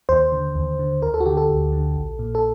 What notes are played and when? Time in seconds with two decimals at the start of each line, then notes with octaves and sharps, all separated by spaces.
0.09 D#2 C5
0.32 D3
0.55 D#2
0.79 D3
1.02 D2 A#4
1.14 A4
1.20 F#4
1.26 D3 G4
1.37 A4
1.49 D2
1.72 D3
1.96 A#1
2.19 A#2
2.35 A4